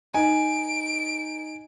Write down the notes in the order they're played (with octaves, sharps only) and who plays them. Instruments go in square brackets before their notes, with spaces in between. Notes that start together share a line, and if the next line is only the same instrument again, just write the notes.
[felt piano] D#4 [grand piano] G#5 [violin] D7